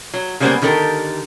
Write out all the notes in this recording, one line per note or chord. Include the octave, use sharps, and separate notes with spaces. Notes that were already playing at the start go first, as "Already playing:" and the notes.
F#3
C#3 G3 G#3 A#3 B3 C5
D3 D#3 G4 A4 A#4